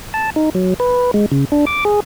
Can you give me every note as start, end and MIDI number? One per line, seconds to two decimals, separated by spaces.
0.14 0.30 81
0.36 0.50 63
0.55 0.74 54
0.80 1.11 71
1.14 1.26 56
1.32 1.45 49
1.52 1.65 62
1.67 1.84 86
1.85 2.00 68